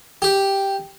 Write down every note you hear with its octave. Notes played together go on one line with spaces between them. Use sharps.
G4